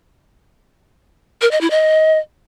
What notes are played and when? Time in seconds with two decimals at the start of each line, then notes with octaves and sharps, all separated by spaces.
1.41 A#4
1.51 D#5
1.61 E4
1.70 D#5